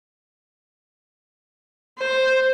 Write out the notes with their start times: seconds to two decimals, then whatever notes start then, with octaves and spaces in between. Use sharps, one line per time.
1.98 C5